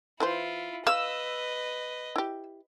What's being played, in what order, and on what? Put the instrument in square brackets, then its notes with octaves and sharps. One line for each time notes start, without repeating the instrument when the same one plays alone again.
[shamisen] E3 B4 C5 [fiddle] E4 F4
[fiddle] B4 D#5 [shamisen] F5 [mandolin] E6
[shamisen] E4 G4